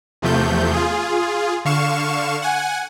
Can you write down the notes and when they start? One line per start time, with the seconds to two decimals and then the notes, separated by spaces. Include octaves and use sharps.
0.22 E2 C3 F3 A3 G6
0.73 F4 G#4
1.65 D3 F5 C#6 E7
2.42 F#5 G#5